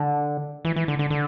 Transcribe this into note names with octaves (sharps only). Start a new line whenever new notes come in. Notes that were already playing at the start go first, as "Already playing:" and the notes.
Already playing: D3
E3
E3
D3
D3
D3